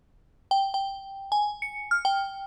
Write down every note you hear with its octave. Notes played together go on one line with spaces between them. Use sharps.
G5
G5
G#5
C#7
F6
G5